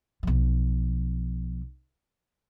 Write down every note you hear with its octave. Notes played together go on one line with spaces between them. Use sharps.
B1 F3